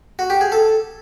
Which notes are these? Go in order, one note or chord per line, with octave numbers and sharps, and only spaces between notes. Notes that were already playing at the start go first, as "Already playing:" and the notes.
F#4
G4
G#4
A4